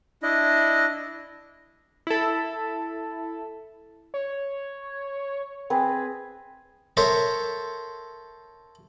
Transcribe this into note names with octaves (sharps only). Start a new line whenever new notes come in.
D4 E4 D#5
E4 A4
C#5
C4 G#4 B4
A4 A#4 C5 C#5 E5